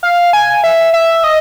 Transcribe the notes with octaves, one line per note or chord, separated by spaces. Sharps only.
F5
G#5
E5
E5
D#5